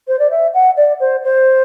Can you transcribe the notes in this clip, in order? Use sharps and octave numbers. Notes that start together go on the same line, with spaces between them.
C5
D5
E5
F#5
D5
C5
C5